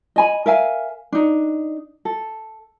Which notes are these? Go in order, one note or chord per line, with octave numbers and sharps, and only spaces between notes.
D#5 G#5 B5
A#4 E5 F5 G#5
D4 D#4
A4